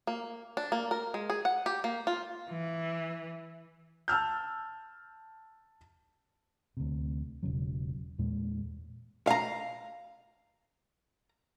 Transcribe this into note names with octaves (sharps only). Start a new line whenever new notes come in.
A#3
D4
A#3
A#4
G#3
G#4
F#5
G4
A#3
F4
E3
A5 E6 F6 G6
D2 C3
E1 B1 C#3 F#3
E2 A#2 G#3
F5 A#5